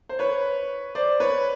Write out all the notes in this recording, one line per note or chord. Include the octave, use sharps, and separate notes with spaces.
C5
B4 C#5
C5 D5
B4 C#5